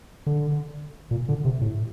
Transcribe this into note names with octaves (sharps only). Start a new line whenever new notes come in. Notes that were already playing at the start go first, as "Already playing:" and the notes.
D3
A#2
D3
C3
A2